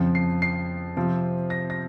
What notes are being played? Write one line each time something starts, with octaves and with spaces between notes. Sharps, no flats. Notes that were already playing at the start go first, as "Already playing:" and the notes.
Already playing: F2 C#3 F3
C7
C7
C3 F3 C4
A#6
A#6